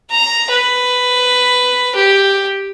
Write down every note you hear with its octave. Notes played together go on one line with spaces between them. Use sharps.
A#5
B4
G4